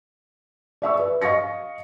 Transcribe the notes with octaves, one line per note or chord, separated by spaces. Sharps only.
D5 E5 C#6 E6
B4
D#5 F5 C#6 A#6 C#7